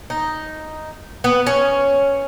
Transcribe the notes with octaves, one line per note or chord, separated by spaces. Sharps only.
D#4
B3
C#4